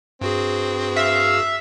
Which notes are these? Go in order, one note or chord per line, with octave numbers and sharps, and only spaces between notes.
G2 C4 F#4 G#4
E5 F5